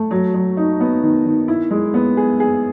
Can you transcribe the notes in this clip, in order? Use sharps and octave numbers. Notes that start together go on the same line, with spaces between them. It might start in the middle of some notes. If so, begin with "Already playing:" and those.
Already playing: A3
F#3
F#3
D#4
B3
D#3
D#3
E4
G#3
B3
G#4
G#4